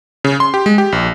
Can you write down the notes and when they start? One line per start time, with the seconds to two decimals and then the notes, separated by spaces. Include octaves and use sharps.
0.24 C#3
0.40 C6
0.54 G4
0.66 G#3
0.78 G4
0.92 A#1